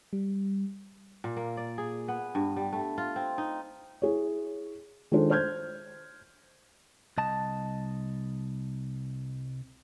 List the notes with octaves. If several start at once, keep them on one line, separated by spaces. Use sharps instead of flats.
G3
A#2
A#3
D5
G#4
B3
G2
G3
A3
F4
C4
D#4
E4 G#4 C#5
D#3 G#3 D4 F4 A4 C5
C5 F6 G6 G#6
C2 D#5 A5